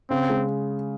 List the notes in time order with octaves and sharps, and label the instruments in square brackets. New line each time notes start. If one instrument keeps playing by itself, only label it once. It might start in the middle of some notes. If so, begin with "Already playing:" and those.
[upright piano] C#3 [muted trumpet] C4
[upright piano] G#3